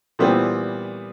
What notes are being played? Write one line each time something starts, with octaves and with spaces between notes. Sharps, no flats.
A#2 E3 G3 B3 C4